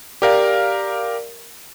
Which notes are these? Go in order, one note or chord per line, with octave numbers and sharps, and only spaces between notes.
G4 A#4 D5 F5